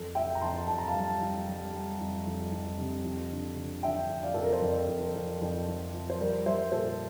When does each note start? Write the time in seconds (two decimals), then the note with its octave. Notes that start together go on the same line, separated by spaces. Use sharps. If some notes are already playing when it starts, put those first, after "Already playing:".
Already playing: F2 A4
0.15 F2 E5 G5
0.35 A#5
0.41 F2 A5 C6
0.68 F2 A5
0.78 A#5
0.88 F5 A5
0.95 G3
1.21 F2
1.47 G3
1.73 G3
2.00 F2
2.26 F2
2.51 F2
2.78 C3
3.05 F2
3.31 D3
3.58 D3
3.83 D3 E5 G5
4.09 F2
4.23 D5 F5
4.34 F2 A4
4.43 A#4
4.53 C5
4.62 F2 A#4 D5
4.88 F2
5.01 A#4
5.15 F2
5.41 F2
5.68 F2
5.93 F3
6.10 C5
6.19 G3 A#4 D5
6.46 G3 C5 E5
6.72 A#2 A4 C5